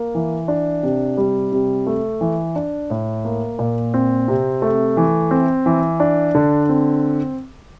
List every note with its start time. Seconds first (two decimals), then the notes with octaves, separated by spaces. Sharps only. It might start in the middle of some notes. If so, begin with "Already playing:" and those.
Already playing: A#3
0.15 E3
0.48 D4
0.83 C3
1.17 G3
1.52 C3
1.87 A3
2.21 E3
2.56 D4
2.90 A2
3.25 A#3
3.59 A#2
3.94 C4
4.28 C3
4.62 A3
4.97 E3
5.31 C4
5.66 E3
6.00 D4
6.35 D3
6.69 C4